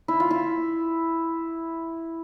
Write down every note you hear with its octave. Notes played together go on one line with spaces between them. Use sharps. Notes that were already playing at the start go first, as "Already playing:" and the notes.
E4
F4
E4